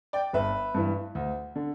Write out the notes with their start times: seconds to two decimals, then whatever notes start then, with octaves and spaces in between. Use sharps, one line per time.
0.13 D5 G5
0.33 G1 B4 E5
0.74 G2 E3
1.15 D2
1.56 D3